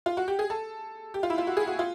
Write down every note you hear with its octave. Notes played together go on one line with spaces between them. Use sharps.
F4
F#4
G4
G#4
A4
G4
F4
E4
F4
F#4
G#4
F#4
F4